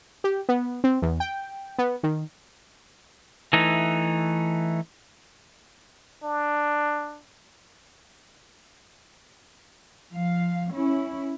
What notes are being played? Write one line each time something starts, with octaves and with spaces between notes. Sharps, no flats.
G4
B3
C4
E2
G5
B3
D#3
E3 A3 D#4
D4
F3 F5
C#4 E4